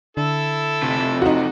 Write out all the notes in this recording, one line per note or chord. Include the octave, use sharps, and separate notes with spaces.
D3 E4 A4
C3 A3
D#4 F#4